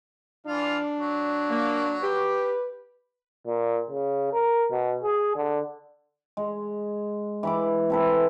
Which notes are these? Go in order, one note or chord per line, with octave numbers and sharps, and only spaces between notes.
E3 D4 F4 F5
F#3
A#3
G4 B4
A#2
C#3
A#4
B2
G#4
D3
G#3
E3 B5 D6
C3 A4 B4